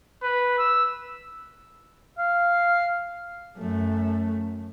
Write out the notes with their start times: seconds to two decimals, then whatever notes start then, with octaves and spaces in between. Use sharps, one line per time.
0.23 B4
0.59 E6
2.18 F5
3.57 F#2 A3